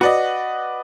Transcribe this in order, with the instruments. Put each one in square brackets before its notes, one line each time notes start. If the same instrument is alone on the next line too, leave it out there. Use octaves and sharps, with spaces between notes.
[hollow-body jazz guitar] F#4 [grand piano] B4 D5 D#5